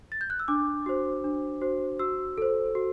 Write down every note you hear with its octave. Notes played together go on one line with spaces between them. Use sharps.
A6
G6
F#6
E6
D4 D6
F#4 C5
D4
F#4 C5
F#4 E6
A4 C5
F#4